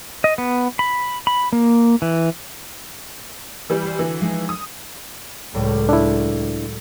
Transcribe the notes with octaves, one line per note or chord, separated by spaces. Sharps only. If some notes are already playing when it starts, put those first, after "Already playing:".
D#5
B3
B5
B5
A#3
E3
E3 G3
C5
D3 E3 F#4
F3 G#3 D#4
D#6
C#2 A2 F#3 D5
D4 E4 E6